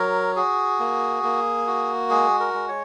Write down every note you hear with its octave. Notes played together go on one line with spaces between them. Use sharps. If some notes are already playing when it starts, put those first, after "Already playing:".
Already playing: F#3 A#4
F#4 G#4
A#3
A#3
F#4
G#3 G#4
A#4
G#3
C#5